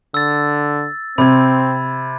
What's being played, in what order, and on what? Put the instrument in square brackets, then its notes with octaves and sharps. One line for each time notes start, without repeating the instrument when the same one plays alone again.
[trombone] D3 [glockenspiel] E6 A6
[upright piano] C3 [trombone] C4 [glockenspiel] B5 G#6